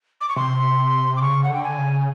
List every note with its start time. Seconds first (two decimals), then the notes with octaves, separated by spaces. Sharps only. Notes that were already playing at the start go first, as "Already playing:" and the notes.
0.21 D6
0.29 C#6
0.36 C3 C6
1.16 D6
1.21 C#3 C#6
1.44 F#5
1.49 D3 G5
1.64 G#5
1.78 C#3